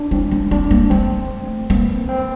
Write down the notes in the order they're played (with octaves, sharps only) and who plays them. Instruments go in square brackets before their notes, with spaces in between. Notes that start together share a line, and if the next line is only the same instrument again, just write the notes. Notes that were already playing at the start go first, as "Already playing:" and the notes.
Already playing: [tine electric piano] D4
[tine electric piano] C4 [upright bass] E4
[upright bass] D4
[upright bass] C4 [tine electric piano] D4
[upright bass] A#3
[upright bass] A3 [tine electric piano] C4
[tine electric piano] A#3 [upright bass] C4
[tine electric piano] C4